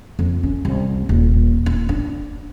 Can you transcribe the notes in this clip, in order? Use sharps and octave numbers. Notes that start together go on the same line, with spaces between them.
F2
C#4
C2
D#1
E4
D4